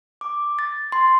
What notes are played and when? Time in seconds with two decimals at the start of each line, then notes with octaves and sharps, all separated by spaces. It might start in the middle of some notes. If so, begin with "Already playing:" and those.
0.21 D6
0.59 A6
0.92 C6